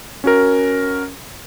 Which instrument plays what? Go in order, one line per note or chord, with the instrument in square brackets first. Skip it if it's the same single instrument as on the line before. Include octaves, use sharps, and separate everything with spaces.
[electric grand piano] C#4 F#4 A#4